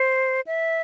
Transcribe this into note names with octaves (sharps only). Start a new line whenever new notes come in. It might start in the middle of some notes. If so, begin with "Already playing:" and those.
Already playing: C5
E5